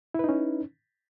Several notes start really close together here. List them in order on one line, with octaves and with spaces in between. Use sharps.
E4 B4 D#4 C#4